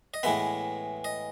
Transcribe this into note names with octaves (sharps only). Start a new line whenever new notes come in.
D#5
A2 E3 G#3 B3 E5
D#5